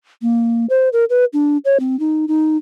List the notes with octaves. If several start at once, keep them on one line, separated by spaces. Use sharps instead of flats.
A#3
C5
A#4
B4
D4
C#5
C4
D#4
D#4